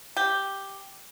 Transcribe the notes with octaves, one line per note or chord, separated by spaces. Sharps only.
G4